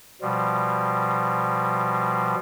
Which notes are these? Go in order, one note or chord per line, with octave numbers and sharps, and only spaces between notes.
B2 F3 G3